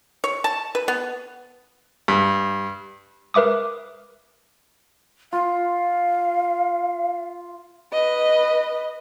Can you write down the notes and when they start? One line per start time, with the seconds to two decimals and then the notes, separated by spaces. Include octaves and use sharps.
0.24 C#5
0.44 A5
0.75 B4
0.88 B3
2.08 G2
3.34 A#4 B4 E5 D6 D#6
5.33 F4 F5
7.93 B4 D#5